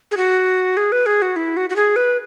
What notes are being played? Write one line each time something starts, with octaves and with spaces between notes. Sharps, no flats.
G#4
F#4
G#4
B4
G#4
F#4
E4
F#4
F#4
G#4
B4